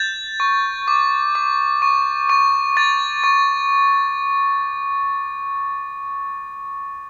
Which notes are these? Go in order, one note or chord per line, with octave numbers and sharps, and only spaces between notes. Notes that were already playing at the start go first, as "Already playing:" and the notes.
Already playing: G6 A6
C#6
D6
D6
C#6
C#6
C#6 A6
C#6